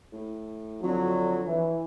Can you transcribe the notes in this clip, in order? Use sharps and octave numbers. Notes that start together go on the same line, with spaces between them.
A2
F2 D3 F#3
E3